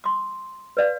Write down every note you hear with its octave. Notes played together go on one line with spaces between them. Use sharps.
C6 D#6
B4 D5 F5